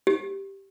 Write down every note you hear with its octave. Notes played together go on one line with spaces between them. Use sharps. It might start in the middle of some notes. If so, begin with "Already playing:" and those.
G4